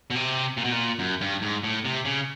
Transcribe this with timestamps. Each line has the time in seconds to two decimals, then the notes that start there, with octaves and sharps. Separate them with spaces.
0.10 B2
0.15 C3
0.57 A#2
0.64 B2
0.72 A#2
0.99 F#2
1.21 G2
1.42 G#2
1.63 A2
1.85 C3
2.05 C#3